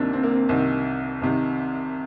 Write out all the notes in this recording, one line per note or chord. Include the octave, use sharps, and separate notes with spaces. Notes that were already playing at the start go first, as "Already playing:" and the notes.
Already playing: C2 C3 D#3 A#3 C4 D4
C4
A#3
C4
C2 C3 D#3 C4
C2 C3 D#3